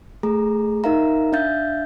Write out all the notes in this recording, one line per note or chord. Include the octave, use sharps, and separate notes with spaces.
A3 G#4 A#5
D#4 A#4 E5 F5 A#5
D4 E5 F5 G6 A6